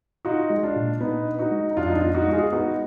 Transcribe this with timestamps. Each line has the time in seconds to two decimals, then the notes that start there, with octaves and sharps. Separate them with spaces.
0.25 D#4 F4 F#4
0.50 G#3
0.63 D4 F4
0.76 A#2
1.00 A#2 B3 D#4
1.26 D4
1.39 D#4 F#4
1.51 G#3
1.71 D#4
1.77 F2 D4 F4
1.88 D#4
1.95 D4 F4
2.02 B3
2.15 D#4 F#4
2.27 G#3 F#4
2.33 F4 G#4
2.52 B3 D#4 F#4